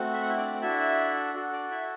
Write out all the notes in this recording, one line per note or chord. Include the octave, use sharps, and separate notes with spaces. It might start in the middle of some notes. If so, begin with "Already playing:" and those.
Already playing: A3 C4 F#4
E5
F#5
E4 E5
D4 D5
D4 E4 F#4 A4 E5
D4 F#4 A4
D4 D5
E4 E5